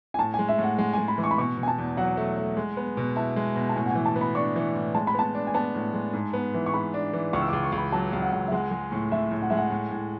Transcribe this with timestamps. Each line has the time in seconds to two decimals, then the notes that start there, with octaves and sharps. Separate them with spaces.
0.14 G#5
0.19 A2 A5
0.34 G#3 G#5
0.49 E5
0.58 A2 F#5
0.78 G#3 F#5
0.93 G#3 G#5
1.08 B5
1.18 E3
1.24 C#6
1.31 B5
1.38 B2 C#6
1.57 B2
1.63 G#5
1.68 A5
1.78 E2
1.97 F#3 F#5
2.17 A3
2.37 A3
2.57 G#3
2.77 B3
2.97 B2
3.16 E4 A5
3.36 G#3
3.56 B2
3.69 A5
3.75 A2 G#5
3.86 F#5
3.90 E3 G#5
4.06 A5
4.16 B3
4.21 B5
4.35 D4 C#6
4.56 E3
4.76 A2
4.94 G#3 A5
5.07 B5
5.14 B3 A5
5.35 D4
5.47 G#5
5.54 B3 A5
5.75 A2
5.94 G#3
6.13 G#2
6.33 B3
6.54 E3
6.66 C#6
6.74 G#2 B5
6.94 D4
7.13 E3
7.33 C#2 C#6
7.42 E6
7.48 C#2 D6
7.63 C#6
7.72 C#2
7.78 B5
7.92 F#3 A5
8.13 C#2
8.22 F#5
8.32 C#2
8.48 E5
8.52 G#3 F#5
8.71 G#3
8.92 A2
9.12 A2 E5
9.31 A2
9.42 F#5
9.50 G#3 E5
9.57 F#5
9.71 A2
9.91 A2